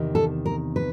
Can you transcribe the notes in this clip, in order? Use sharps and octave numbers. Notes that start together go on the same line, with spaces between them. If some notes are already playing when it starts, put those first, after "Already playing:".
Already playing: E2 C3 D#3
A4
A#4
B4